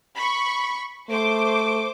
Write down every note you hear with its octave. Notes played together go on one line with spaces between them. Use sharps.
B5 C#6
A3 C5 D6